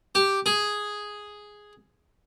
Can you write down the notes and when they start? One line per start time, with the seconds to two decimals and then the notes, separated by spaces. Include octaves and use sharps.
0.15 G4
0.46 G#4